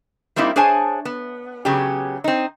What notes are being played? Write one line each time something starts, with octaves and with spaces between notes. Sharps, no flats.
G3 A#3 C4 D#4 E4
D4 G#4 C5 C#5 G#5 A5
B3
C#3 F#3 B3 C#4 G4
C4 D#4